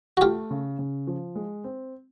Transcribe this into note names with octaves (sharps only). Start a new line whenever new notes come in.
F#4
A3 F4 G4
C#3
C#3
F3
G#3
C4